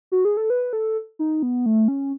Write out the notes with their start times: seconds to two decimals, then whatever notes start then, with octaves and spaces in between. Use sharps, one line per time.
0.12 F#4
0.25 G#4
0.37 A4
0.50 B4
0.73 A4
1.19 D#4
1.43 B3
1.66 A3
1.88 C#4